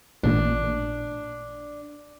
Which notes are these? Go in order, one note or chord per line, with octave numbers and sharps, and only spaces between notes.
A1 A#2 D4